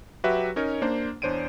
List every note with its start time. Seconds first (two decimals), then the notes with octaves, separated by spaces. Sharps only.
0.24 F#3 F#4 G4 B4 E5
0.56 C#4 D#4 A#4 C#5
0.82 A#3 D4 C5
1.22 E2 D4 C5 C#5 D7 D#7